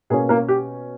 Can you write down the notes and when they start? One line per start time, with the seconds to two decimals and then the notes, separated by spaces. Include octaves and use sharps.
0.10 B2 A#3 C#4 G#4
0.29 A#3 A#4
0.49 G4